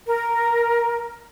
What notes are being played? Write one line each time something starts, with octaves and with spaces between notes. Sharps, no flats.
A#4